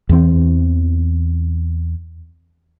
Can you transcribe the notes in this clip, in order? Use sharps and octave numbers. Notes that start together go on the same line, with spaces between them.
E2 E3 C4